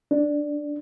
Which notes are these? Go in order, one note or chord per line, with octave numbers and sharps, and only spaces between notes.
D4